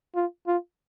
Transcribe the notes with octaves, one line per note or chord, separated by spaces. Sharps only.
F4
F4